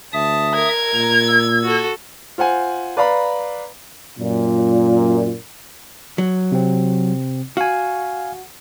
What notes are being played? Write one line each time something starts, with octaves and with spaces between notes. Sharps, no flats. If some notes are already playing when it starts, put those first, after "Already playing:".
D2 E5 A5 D#6
A#4 G#6
A#2 A#5
E6
F#4 A4
F4 C5 F#5 G#5
B4 D5 F5 A#5 B5
F#2 A#2
F#3
C3 C4
F#4 F5 G#5